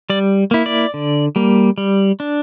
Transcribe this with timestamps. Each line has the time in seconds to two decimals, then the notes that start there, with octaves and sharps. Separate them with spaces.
0.10 G3 D5
0.51 A#3 E4
0.66 D5
0.94 D3
1.36 G3 A#3
1.78 G3
2.20 D4